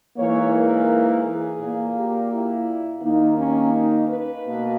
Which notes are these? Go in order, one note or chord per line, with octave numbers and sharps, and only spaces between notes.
G#2 E3 A#3 C#5
A#4
G#4
A#2 A#3
G4
E4
D#2 D#3 A#3 D#4
C#4
D#4
B4
B2 A#3